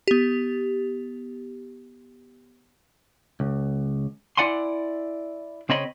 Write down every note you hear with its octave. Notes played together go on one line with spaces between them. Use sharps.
B3 G4
C#2
E4 D5 F#5 G#5 C6
C#3 C4 C#5 D#5 B5